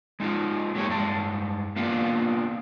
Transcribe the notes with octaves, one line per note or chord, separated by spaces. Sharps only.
G#3 D#4 F4 G#4
F#3 G#3 A#3 G4 C#5
G2 G#3 A5
A#3 B3 D4 F4 F5